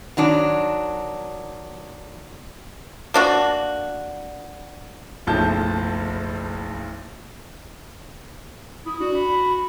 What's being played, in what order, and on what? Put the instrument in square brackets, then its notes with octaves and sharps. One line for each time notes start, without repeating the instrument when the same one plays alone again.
[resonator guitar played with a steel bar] D#3 F#3 D4
[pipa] A#3 D4 F#4
[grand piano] F#1 B1 F3 A3 A5 G6
[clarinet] E4 [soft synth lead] D#6
[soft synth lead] D4 [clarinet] F#4
[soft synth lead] B5